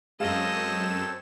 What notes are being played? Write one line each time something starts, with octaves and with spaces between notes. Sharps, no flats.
F#2 G#3 C4 A4 C#5 D#5 F5 E7